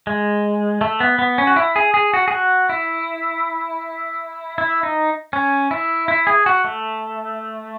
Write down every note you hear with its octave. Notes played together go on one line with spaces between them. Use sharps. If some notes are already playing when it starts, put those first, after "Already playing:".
G#3
A3
B3
B3
C#4
F#4
E4
G#4
G#4
F#4
G#4
F#4
E4
E4
D#4
C#4
E4
E4
G#4
F#4
A3